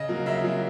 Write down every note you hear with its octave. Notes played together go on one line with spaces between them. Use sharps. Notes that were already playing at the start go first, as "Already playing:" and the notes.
Already playing: C#3 D#5
F#3 A#3
C#3 E5
F#3 A#3